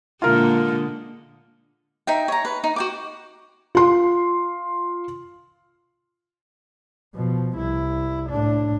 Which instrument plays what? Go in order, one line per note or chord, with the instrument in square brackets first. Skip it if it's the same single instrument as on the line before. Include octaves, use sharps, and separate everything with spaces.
[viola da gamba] A#2 D3 G#3 [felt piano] F4 A#4
[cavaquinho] D#4 E5 G5
C#5 A#5
B4
D#4
F#4 G5 D6
[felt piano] F4 C6
[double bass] B2 F3
C2 E4
A2 D4